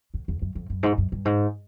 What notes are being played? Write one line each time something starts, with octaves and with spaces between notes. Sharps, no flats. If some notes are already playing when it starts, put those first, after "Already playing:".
E2
E2
F#2
F2
F#2
G#2
F#2
G2
G#2